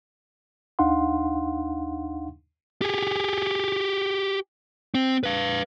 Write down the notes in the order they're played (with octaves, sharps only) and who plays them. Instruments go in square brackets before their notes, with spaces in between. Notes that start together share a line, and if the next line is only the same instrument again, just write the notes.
[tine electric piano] D#2 D4 D#4 F5 F#5 C6
[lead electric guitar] G4 G#4
C4
B4 F5